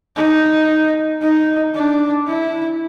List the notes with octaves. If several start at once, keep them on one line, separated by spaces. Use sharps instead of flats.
D#4
D#4
D4
E4